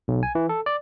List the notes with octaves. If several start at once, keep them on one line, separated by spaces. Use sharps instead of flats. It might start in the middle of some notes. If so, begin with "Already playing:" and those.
B1
G#5
E3
A4
D5